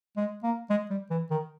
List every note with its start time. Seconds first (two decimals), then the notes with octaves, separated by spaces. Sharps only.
0.17 G#3
0.44 A#3
0.70 G#3
0.90 G3
1.10 E3
1.31 D#3